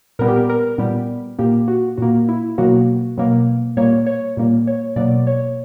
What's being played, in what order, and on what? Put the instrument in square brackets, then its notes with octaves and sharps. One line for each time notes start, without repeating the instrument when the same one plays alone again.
[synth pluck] A#2 G3 B3 A#4
G4
A#4
A#4
A#2 G3 B3
A#2 A#3 G4
F#4
A#2 A#3 F#4
E4
B2 F#3 A#3 F#4
B2 F#3 A#3
A#2 G3 A#3 C#5
C#5
A#2 G3 A#3
C#5
B2 F#3 A#3 D5
C#5